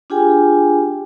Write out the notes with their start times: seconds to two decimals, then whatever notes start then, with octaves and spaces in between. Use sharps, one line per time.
0.10 D4 F4 G4 G#4 G5 G#5